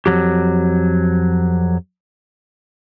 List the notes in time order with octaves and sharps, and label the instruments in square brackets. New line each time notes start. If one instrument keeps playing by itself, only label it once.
[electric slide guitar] F2 E3 F#3 G4